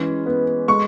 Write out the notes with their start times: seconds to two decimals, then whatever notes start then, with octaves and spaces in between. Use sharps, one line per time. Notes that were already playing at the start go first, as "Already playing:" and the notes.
Already playing: E3 G#3 C#4
0.26 B3
0.68 G#3 C#6